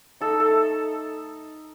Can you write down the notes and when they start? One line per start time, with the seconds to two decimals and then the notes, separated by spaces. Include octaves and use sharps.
0.21 D#4 A4
0.40 A4
0.50 A3